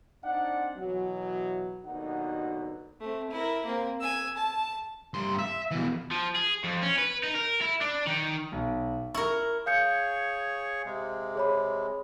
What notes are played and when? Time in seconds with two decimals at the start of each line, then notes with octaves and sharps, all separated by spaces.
0.24 C4 D4 D#4 D5 F#5
0.77 B2 E3 F#3
1.85 D#2 B2 D3 F#3 D#4 F#5
3.01 A3 C4
3.31 E4 A#4
3.65 A#3 C4
4.00 G#5 E6
4.37 A5
5.14 G2 C6
5.39 E5
5.71 B2 E3
6.11 F3
6.35 G#4
6.64 F2
6.82 C#4
6.98 B4
7.23 D#4
7.35 A#4
7.62 E4
7.81 D4
8.07 D#3
8.52 B1
9.14 E4 A#4 C#6
9.66 G#4 C#5 F5 C#6 G6 C#7
10.85 C3 G#3
11.35 G#4 C#5 B5